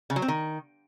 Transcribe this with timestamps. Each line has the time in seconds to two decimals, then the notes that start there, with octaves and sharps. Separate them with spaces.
0.10 C#3
0.16 F#3
0.22 C4
0.28 D#3